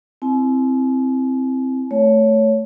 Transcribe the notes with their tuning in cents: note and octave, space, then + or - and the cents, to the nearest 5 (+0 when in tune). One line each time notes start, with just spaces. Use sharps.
C4 +0 E4 +0 G#5 +45
A3 +0 C#5 +10